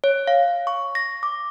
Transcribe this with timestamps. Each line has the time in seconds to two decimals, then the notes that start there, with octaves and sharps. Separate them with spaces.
0.04 C#5
0.27 F5
0.67 C#6
0.95 A#6
1.23 D6